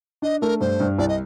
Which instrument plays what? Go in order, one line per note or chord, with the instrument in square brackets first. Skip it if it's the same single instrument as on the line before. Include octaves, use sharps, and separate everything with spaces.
[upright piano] D4 [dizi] D#5
[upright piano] A3 [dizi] A#4
[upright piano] G2 [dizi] C5
[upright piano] G2
[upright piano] C2 [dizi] D5
[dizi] D#5